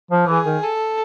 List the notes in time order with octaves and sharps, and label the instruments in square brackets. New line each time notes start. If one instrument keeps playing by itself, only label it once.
[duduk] F3
[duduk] E3 [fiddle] G#4
[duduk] D#3
[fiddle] A4